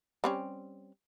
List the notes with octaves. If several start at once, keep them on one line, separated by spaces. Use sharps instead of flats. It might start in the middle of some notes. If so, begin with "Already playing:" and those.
G3 C4 C#4